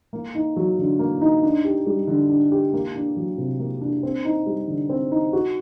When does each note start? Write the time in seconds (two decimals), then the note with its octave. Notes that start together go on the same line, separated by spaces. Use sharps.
0.13 A#3
0.35 D#4
0.56 F#3
0.78 D3
0.99 A#3
1.21 D#4
1.43 D4
1.65 G4
1.86 G3
2.07 D3
2.29 D4
2.52 G4
2.73 A#3
2.95 D4
3.17 F#3
3.38 C3
3.60 A#3
3.81 D4
4.03 C4
4.25 D#4
4.46 G3
4.68 D3
4.89 C4
5.12 D#4
5.33 F#4